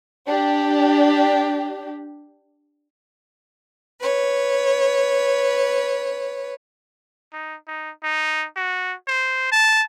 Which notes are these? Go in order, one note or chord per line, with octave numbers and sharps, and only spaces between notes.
D4 G4
B4 C#5
D#4
D#4
D#4
F#4
C5
A5